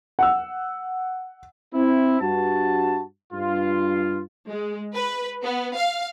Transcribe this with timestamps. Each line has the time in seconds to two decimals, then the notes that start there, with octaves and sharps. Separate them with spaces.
0.19 F#5 E6
1.74 C4 E4
2.21 G2 F#4 A5
3.33 G2 F4
4.47 G#3
4.93 B4
5.42 B3
5.75 F5